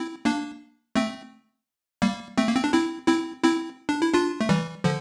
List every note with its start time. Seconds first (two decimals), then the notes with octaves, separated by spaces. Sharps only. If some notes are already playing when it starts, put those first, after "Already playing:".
Already playing: C4 E4
0.25 A#3 D4
0.95 A3 C4
2.02 G3 A#3
2.38 A3 C4
2.47 A#3
2.56 C4
2.64 D4
2.73 C4 E4
3.07 C4 E4
3.44 C4 E4
3.89 D4
4.01 E4
4.14 D4 F4
4.41 A3
4.49 E3 G3
4.84 D3 F3